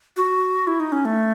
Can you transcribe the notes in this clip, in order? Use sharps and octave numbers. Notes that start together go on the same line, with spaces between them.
F#4
E4
D#4
C#4
A3